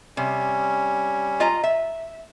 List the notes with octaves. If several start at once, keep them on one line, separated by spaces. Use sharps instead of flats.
C3 G3 C#4
F4 D#5 A#5
E5